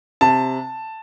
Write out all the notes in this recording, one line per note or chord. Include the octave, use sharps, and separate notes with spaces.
C3 A5